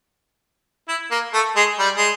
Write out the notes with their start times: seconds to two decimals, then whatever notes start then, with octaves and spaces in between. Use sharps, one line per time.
0.88 E4
1.11 A#3
1.34 A3
1.56 G#3
1.79 G3
1.97 G#3